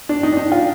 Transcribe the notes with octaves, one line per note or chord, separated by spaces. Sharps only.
D4
D#4
D4
D#4
F4